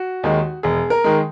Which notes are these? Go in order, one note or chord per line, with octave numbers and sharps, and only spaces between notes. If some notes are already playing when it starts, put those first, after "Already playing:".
Already playing: F#4
D#2 D#3 G#3
E1 G#4
A#4
D#3 G#3